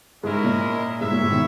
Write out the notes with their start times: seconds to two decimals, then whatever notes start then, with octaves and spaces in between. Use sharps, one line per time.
0.24 G#2 G#3 C#4 E4 A#4 D#5
0.44 A#2
1.01 G#2 E4 G#4 C#5 E5
1.11 A#2
1.21 G#2
1.31 B2 D#3